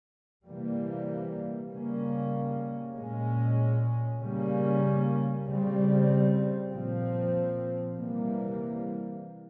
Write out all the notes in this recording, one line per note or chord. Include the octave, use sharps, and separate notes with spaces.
C3 E3 G3 A#3
C#3 G3 A#3 C#4
A#2 G#3 C#4
C#3 G3 A#3 C#4
C#3 G3 C4
A#2 F3 C4
C3 E3 G3 A#3